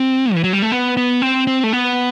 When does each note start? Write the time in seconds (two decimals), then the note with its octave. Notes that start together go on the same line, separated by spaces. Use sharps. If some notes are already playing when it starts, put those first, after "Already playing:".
Already playing: C4
0.34 E3
0.44 F#3
0.53 G3
0.62 A3
0.72 B3
0.97 B3
1.22 C4
1.47 C4
1.64 A3
1.73 B3